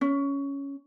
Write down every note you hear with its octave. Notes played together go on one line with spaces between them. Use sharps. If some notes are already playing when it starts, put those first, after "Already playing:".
C#4